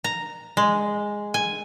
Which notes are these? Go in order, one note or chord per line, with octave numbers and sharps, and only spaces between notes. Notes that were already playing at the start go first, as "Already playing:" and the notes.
A#5
G#3
G#5